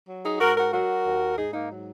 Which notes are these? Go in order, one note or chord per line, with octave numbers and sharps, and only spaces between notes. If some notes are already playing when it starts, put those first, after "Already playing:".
F#3
D#4 G#4
G#2 F#4 A#4
F#4 A#4
F#3 F#4 A#4
D#2
G#2 D#4 G#4
A#3 D#4
F#3